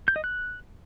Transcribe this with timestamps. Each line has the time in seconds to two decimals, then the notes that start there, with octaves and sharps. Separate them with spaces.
0.08 G6
0.16 D#5
0.24 F#6